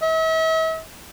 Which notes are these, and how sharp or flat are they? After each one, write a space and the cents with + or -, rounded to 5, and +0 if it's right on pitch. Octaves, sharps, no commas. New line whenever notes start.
E5 -40